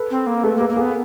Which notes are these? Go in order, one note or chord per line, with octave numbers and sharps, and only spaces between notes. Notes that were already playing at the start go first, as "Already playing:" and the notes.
Already playing: A4 B4
C4
A#3
A3 A4 B4
A#3 A4 B4
A#3
G#4 A#4
B3